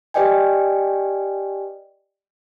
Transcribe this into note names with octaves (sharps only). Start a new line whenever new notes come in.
G4 B4 D5 D#5 G5 G#5